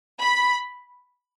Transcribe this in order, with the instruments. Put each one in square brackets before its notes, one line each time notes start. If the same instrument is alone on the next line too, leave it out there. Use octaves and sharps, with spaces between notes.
[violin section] B5